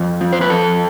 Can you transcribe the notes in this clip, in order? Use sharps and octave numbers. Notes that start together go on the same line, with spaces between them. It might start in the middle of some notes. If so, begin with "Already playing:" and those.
Already playing: F2
F3
C5
B4
F2 A4